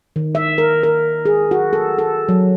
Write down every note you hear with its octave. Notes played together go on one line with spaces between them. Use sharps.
D#3
E5
A#4
A#4
G#4
F#4
A4
A4
F#3